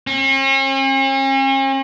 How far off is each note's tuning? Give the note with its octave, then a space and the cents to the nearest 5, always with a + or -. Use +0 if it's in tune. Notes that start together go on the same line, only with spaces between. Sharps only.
C#4 -45